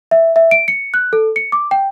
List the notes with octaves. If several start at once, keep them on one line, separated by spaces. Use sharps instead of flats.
E5
E5
D7
C#7
F#6
A4
C#7
D6
G5